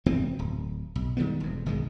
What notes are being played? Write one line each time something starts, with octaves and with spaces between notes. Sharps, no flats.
F1 E2 E3 C4
D1
B1
D#3 G3 G#3 B3
E1 F2
F#1 B1 D#3 G#3